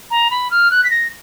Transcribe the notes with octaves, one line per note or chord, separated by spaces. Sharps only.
A#5
B5
F6
F#6
B6
A#6